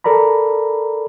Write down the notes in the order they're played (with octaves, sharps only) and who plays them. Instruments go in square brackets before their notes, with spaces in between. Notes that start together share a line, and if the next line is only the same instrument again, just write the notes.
[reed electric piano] A4 A#4 D5 A#5 B5